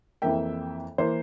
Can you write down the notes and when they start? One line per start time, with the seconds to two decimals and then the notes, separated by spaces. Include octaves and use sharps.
0.22 F2 E3 A#3 E5 G5
0.98 E3 A#3 C5